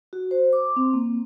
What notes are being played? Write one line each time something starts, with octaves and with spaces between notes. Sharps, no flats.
F#4
C5
D6
C4
A#3